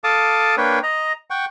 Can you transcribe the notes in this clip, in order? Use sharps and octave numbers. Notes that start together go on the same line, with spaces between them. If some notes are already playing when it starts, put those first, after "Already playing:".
A4 F5 A5 D6 D#6
A#3 D4 B4 C#5 G5
D#5 A#5
F#5 G5 C#6